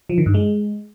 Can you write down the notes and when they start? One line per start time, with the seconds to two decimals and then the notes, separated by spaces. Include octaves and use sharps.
0.09 F3
0.18 D#3
0.26 G2
0.34 G#3